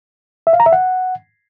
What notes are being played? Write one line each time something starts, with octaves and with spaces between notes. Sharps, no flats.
E5
F5
A#5
E5
F#5